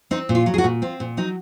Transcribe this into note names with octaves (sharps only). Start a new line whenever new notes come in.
C4 D#4
A#2
F4
F#3
G#4
F#4
A#2
C4 F4
A#2
F#3 D#4